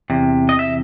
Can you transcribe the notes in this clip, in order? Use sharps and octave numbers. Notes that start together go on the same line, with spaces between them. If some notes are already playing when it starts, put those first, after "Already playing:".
E2 C3
D#5
E5